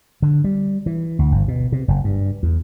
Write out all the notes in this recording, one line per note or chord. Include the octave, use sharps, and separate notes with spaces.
D3
G3
E3
D2
G1
B2
C3
F#1
G2
E2